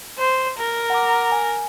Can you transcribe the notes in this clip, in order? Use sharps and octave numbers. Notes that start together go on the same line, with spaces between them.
C5
A#4
F#5 A#5 D6
G#5